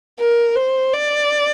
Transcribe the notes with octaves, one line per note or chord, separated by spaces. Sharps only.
A#4
C5
D5